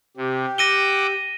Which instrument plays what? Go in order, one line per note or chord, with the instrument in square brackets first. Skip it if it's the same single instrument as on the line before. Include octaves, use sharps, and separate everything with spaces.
[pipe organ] C3 [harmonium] G4
[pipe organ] F#5 D6 E6 [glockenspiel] A#6 D#7 G7